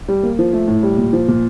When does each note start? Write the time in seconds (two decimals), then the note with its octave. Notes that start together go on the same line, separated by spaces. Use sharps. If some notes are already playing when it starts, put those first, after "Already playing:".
0.08 G3
0.23 A#3
0.39 F3
0.53 A3
0.68 A2
0.83 G3
0.98 A#2
1.13 F3
1.28 A#2